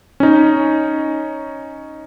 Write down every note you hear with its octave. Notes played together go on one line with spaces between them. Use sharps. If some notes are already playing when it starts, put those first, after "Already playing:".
C#4 D#4